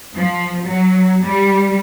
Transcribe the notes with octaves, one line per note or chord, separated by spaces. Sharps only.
F3
F#3
G3